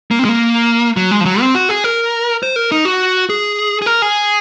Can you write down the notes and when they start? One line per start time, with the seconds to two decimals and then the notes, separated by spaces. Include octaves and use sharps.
0.11 A#3
0.19 C4
0.25 G#3
0.29 A#3
0.97 F#3
1.11 G#3
1.21 F3
1.25 F#3
1.41 C4
1.55 F#4
1.69 G#4
1.84 A#4
2.43 C5
2.56 A#4
2.72 D#4
2.85 F#4
3.30 G#4
3.82 G#4
3.86 A#4
4.02 G#4